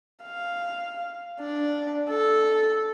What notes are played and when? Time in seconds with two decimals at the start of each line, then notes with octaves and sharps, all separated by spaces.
0.24 F5
1.40 D4
2.09 A4